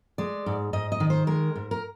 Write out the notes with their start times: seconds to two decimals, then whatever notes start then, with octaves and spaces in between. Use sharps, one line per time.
0.18 G#3 D5
0.46 G#2
0.73 G#2 D#5
0.92 D#5
1.00 D#3
1.10 C5
1.27 G#3 A#4
1.56 G#2
1.71 A#4